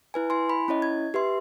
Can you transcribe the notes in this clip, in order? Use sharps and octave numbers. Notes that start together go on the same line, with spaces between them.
E4 B4 G#5
E4 G#5 C6
B5
C#4 E4 C#5 D#5
G#6
G4 B4 E5 C6